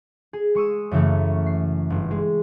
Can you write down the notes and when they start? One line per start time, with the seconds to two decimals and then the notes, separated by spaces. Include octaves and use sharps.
0.33 G#4
0.55 G#3 C#6 D#6 E6
0.91 F#2 C#3 E3 F#3 A3
1.46 C7
1.90 G1
2.11 G#3